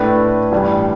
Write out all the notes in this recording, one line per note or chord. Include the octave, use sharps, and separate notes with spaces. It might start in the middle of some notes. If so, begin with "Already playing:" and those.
Already playing: A2 A3 D4 B4
A1 G2 G3